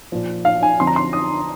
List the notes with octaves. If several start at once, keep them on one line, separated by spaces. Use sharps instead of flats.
A#2 F3
F5
G#5
F2 D3 F3 C6
A#5
C6
D#6